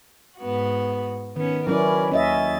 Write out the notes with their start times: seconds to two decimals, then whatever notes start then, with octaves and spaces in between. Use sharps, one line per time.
0.39 G#2 B3 F#4
1.36 D#3 B3 C#4
1.67 F#3 C#4 E4 A#4 B4 D5
2.12 D#2 C#4 D#5 E5 A6